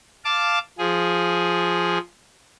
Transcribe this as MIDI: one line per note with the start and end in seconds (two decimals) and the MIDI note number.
0.25 0.59 77
0.25 0.59 81
0.25 0.59 86
0.78 1.98 53
0.78 1.98 68